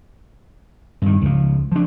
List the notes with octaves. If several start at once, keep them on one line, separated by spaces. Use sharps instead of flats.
G2 D#3
C#2 F3
F3 D4